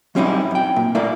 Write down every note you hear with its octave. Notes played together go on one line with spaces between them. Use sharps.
F#3 G3 C4 C#4 D#4 E4
F#2 G5
A#2
A3 E4 A#4 D5 F5